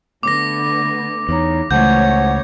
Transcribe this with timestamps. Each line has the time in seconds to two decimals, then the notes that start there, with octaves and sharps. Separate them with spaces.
0.23 D3 A3 B3 D6 A#6
1.29 E2 D#4 C#5 A#5
1.71 C#2 A2 E3 A3 C5 C#5 F#5 G6